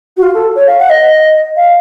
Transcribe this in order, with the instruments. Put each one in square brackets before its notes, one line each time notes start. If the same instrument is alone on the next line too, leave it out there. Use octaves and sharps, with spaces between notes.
[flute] F#4
F4
A4
C#5
F5
F#5
D#5
F5